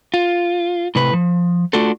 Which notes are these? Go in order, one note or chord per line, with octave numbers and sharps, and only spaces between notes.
F4
A2 C3 B4
F3
A3 D4 F4 F#4 A4